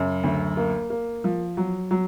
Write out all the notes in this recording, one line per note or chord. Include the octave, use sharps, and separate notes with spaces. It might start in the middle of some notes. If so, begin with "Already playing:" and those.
Already playing: F#2 C#3
D2
A#3
A#3
F3
F#3
F#3